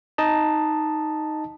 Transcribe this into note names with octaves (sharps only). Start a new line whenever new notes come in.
D#4 D#5 A5